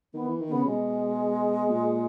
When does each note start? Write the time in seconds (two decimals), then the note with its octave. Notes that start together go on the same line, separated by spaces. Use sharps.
0.14 D#3 B3
0.27 E3
0.41 D#3
0.49 C#3 B3
0.66 B2 G#3
1.69 A#2